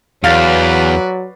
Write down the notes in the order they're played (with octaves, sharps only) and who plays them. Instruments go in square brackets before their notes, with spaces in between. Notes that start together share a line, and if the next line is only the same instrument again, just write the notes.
[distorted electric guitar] E2 [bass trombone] F#3 [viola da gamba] F#4 B4 D5 [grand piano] F5 A6